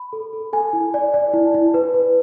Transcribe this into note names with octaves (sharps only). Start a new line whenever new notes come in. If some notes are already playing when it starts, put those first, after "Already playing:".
Already playing: B5
A4
A4
A4 G#5
E4
D5
D5
E4
E4
B4
B4